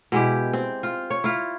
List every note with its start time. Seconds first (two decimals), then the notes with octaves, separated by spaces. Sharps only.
0.12 B2 G#3 E4 G4
0.53 C4
0.83 F4
1.10 C#5
1.24 E4 F4